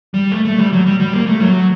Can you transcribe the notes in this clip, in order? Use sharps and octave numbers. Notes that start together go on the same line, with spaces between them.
G3
A3
A3
G3
F#3
G3
G3
A#3
A3
F#3